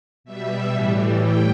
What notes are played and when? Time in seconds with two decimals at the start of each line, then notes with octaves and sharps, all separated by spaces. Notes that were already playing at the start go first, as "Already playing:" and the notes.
0.24 B2 G3 E5
0.73 A2 E3 G3
1.21 A2 G5